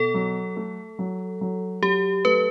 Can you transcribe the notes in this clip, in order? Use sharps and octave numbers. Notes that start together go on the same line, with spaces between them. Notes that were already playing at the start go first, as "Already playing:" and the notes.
Already playing: B2 A4
F#3
A3
F#3
F#3
F#3 G4
A3 B4